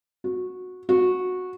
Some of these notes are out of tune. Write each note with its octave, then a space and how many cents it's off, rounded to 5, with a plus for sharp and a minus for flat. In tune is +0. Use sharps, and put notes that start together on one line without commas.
F#4 -15
F#4 -15